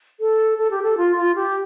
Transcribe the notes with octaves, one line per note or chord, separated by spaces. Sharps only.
A4
A4
G4
A4
F4
F4
G4